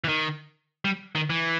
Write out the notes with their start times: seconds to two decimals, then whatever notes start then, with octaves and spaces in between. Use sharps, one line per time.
0.04 E3
0.08 D#3
0.85 G3
1.15 D#3
1.30 E3